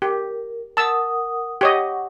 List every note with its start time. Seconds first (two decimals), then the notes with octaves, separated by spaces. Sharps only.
0.02 G4 A#4
0.77 A#4 F#5 A5 D#6 E6
1.61 G4 C#5 D#5 F#5 C#6